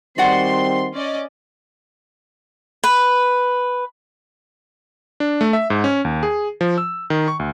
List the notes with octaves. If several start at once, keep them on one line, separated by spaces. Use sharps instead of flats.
D#3 G3 C4 F#4 D5 F#5 C6
C#4 D5 D#5
B4
D4
A3
E5
G#2
C#4
D#2
G#4
F3
E6
D#3
C#6
D2